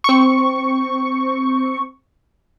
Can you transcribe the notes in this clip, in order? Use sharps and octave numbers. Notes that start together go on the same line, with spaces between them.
C4 C#6